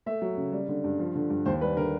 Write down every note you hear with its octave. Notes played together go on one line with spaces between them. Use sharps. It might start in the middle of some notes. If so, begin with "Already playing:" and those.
A3 E5
F#3
C#3
G3
D3
G2
F3
D3
G2
D#2 C5
G3 B4
D3 A#4